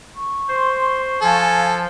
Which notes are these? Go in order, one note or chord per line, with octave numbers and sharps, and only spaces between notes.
C#6
C5 C6
F3 A4 F5 G#5